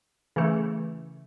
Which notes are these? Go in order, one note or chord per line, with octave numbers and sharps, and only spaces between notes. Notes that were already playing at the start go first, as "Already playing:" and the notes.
C#3 E3 A3